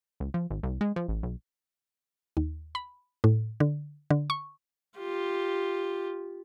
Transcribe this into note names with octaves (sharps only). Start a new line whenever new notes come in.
C#2
F3
G#1
C2
G#3
F3
A1
B1
D#2
B5
A2
D3
D3
C#6
F4 G4